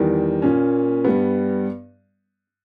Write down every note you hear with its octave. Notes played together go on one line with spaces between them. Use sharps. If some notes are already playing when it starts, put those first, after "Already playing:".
Already playing: E2 D#3 G3
A#2 A#3 C#4
G2 G3 B3